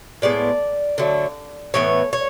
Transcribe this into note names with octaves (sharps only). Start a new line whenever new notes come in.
A2 G#3 B3 D5
D3 F#3 A3
A2 E3 B3 C#5
C#5